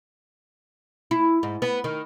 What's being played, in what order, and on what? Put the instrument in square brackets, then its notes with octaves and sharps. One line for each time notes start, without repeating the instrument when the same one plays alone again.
[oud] E4
G#2
B3
D#3